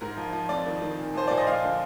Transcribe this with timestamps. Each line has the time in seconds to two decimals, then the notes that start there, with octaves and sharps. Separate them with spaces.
0.01 G#2 A#4
0.17 F3
0.33 F3
0.49 F2 D5
0.66 D#3
0.82 D#3
0.98 A#2
1.14 F3 C5
1.28 A#2 D5
1.37 D#5
1.47 F3 F5
1.62 D3